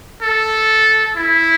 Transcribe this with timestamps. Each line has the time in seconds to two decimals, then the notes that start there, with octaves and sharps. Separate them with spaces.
0.22 A4
1.16 E4